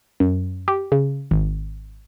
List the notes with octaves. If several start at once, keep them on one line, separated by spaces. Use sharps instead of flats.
F#2
G4
C#3
G#1